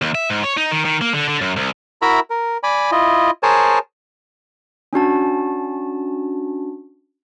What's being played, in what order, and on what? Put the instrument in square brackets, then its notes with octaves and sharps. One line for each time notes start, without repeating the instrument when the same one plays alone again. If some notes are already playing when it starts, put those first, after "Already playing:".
[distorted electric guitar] D#2
E5
G#2
C#5
D#4
D#3
D#3
A#3
D3
D3
F#2
C2
[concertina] E4 F#4 A#4 E5 A#5 B5
A#4
D5 G#5 B5
E4 F4 D#5
G#4 A#4 C5 C#5 G#5 A5
[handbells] C#4 D4 F#4 A5